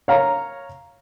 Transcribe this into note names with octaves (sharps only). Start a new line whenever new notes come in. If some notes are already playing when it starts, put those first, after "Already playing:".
C#5 F5 A#5